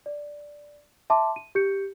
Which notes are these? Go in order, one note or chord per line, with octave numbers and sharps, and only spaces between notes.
D5
E5 A5 C6 D6
D#7
G4 G6 C#7